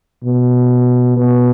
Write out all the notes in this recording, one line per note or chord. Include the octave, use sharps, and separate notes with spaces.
B2
B2